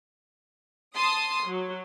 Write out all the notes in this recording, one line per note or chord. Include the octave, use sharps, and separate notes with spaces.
A5 C6 D#6
F#3